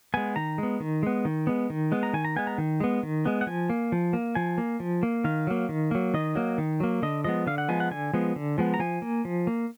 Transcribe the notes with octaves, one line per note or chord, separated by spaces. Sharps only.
G#3 B3 G#5
D#3 A#5
G#3 B3
D#3
G#3 B3
D#3
G#3 B3
D#3
G#3 B3
A#5
D#3 G#5
A#5
G#3 B3 G#5
A#5
D#3
G#3 B3
D#3
G#3 B3
F#5
F3 G#5
A#3
F3
A#3
F3 G#5
A#3
F3
A#3
D#3 F5
F#3 A#3
D#3
F#3 A#3
D#3 D#5
F#3 A#3
D#3
F#3 A#3
D3 D#5
F3 G#3 B3 D#5
D3 F5
F#5
F3 G#3 B3 G#5
F#5
D3 G#5
F3 G#3 B3
D3
F3 G#3 B3
A#5
F3 G#5
A#3
F3
A#3